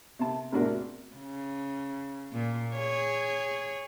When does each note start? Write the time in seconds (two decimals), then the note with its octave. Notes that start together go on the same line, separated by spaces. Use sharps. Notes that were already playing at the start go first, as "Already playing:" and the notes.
0.19 C3 A5
0.52 A1 E2 C3 D4 F#4 A#4
1.16 C#3
2.33 A#2
2.74 G#4 C#5